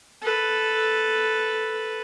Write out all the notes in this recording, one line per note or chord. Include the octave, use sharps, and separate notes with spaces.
A4 B4